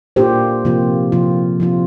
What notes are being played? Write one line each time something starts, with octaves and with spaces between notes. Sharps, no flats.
A#2 A#3 D4 F4 G4 C5
C3 F3 A#3 F4
C3 F3 A#3 F4
F3 C4 F4